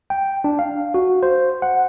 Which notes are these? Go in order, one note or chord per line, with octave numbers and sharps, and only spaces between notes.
G5
D4
F5
F#4
C5
F#5